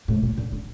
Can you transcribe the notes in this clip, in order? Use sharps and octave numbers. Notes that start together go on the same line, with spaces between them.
A2
A#2
D3
D3